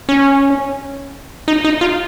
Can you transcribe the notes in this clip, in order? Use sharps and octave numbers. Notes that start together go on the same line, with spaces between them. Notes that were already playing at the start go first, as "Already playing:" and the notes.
C#4
D#4
D#4
F4